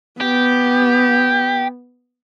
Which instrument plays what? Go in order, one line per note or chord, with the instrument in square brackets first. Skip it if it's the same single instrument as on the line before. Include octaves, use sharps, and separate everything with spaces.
[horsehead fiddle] B3 [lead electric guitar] G4